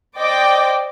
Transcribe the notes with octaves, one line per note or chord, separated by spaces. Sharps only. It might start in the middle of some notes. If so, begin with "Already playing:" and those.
C5 D5 D#5 G5 D6